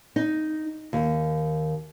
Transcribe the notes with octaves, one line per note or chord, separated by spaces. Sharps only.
D#4
D#2